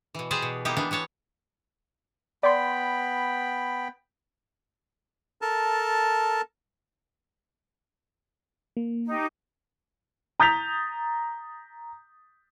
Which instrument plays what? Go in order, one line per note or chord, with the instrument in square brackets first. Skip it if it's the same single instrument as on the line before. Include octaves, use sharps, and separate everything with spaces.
[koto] B2 E3
G4 G#4 B4 C5 D5
B2
A#3 B3 D#4 E4 G4
E3 B3 D4
E3 B3 C#5 A5
[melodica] B3 G5 B5 [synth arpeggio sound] D5 C6
[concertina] A4 A#4 A5
[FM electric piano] A#3
[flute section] D#4 G4
[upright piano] A#5 D#6 G6 A6 B6 F7